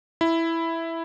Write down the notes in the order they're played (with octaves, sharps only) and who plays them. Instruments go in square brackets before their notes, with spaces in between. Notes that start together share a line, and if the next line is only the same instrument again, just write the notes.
[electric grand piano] E4